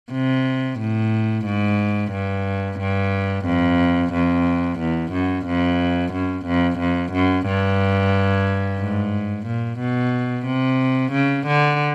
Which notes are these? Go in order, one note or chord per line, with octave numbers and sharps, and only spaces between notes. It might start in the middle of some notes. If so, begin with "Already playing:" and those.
C3
A2
G#2
G2
G2
F2
F2
E2
F#2
F2
F#2
F2
F2
F#2
G2
G#2
A#2
B2
C3
C#3
D3